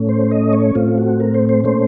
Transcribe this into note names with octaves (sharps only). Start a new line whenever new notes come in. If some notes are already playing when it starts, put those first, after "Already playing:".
Already playing: A2 A3 C#4
C5
D#5
C#5
A2 A3 C4 F4
F#4
A#4
C5
C5
A#2 A3 C#4 C5